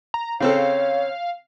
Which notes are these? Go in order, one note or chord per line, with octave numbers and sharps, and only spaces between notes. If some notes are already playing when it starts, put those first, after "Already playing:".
A#5
C#3 C4 A4 C#5 F5